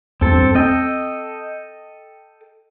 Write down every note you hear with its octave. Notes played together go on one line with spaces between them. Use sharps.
E2 G2 C4 A4
C4 A4 D#5 G5